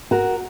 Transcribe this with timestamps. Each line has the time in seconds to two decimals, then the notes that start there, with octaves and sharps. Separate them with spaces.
0.11 F#4 A#4